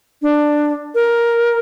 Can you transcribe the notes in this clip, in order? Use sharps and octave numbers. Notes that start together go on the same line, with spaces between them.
D4
A#4